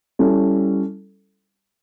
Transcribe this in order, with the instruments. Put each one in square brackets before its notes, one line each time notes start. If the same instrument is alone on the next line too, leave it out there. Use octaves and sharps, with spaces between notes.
[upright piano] G3 C#4 E4 A4